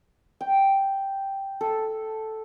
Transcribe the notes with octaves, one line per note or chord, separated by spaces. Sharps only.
G5
A4